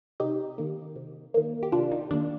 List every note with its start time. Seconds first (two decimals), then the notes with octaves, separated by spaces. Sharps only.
0.20 C3 D#4 G4
0.58 D#3 A#3
0.96 C3
1.34 D#3 A#3
1.63 G4
1.72 C3 D4 F4
1.92 D#4
2.11 D#3 A#3 D4